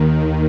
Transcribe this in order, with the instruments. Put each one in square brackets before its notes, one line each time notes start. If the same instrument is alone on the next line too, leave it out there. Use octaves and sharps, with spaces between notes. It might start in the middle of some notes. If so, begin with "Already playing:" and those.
Already playing: [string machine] D#2 D#3